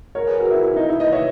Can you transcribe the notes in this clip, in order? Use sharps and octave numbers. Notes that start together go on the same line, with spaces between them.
A#4 C#5
G#4 B4
F#4 A#4
E4
E4
D#4
E4
B4 D#5
C#5 E5